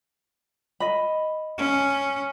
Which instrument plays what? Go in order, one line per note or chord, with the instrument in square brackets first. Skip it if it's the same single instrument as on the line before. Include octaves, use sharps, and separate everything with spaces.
[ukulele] D#5 B5
[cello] C#4